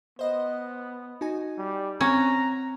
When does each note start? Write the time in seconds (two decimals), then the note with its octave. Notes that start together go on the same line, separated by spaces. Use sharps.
0.19 B3 C5 D#5
1.21 D#4 F#4 G#5
1.58 G3
2.01 C4 C#4 F#5 A#5